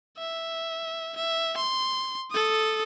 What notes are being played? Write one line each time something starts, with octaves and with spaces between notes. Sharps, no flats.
E5
E5
C6
A4 D#6